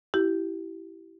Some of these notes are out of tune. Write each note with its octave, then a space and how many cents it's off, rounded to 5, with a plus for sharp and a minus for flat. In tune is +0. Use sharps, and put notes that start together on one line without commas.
E4 +0 G4 -20